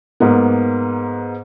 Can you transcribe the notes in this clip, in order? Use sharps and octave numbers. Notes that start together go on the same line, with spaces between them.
G#2 A#3 B3